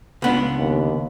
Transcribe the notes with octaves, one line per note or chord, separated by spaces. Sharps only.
C#2 B3 D4
D#2